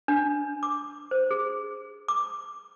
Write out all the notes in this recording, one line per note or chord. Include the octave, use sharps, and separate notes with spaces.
D4
D6
C5
G#4
D6